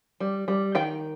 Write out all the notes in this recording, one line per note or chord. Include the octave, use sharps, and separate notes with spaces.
G3
G3
D#3 G5